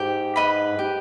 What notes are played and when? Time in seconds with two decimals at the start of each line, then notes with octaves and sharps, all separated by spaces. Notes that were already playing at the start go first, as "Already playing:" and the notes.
Already playing: G#2 G4
0.36 B4 D#5 B5
0.68 G2
0.79 G4